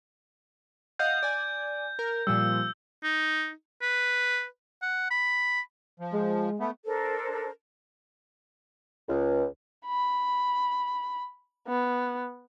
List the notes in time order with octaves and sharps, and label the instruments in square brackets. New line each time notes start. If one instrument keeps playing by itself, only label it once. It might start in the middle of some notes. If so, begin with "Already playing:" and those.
[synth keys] D#5 F5 F#5 [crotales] G6
[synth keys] D5 G#5
A#4
[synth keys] A#2 F3 G3 [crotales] E6
[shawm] D#4
B4
F#5
B5
[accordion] F3
[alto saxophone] G#3
[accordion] A3 B3
[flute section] D4 A4 A#4 C5
[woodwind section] C#2
[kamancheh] B5
B3